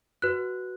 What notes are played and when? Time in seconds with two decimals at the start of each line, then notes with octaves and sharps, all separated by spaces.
0.22 F#4 B4 F#6